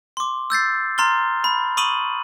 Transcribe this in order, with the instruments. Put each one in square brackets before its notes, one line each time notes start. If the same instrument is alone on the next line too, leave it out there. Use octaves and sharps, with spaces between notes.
[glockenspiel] C6 D6
E6 G6 A6 C7
A#5 C6 F6 A6 G7
B5
B5 C#6 D#6 D#7 F#7